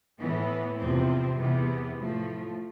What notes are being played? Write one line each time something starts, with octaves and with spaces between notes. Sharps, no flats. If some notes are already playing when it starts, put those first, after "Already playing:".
A2 E3 B3
E2 C3 F3 C4
E2 C3 E3 B3
A2 F3 A3